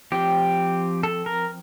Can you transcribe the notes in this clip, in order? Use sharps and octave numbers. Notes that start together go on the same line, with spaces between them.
F3 C4 G4
A4
A#4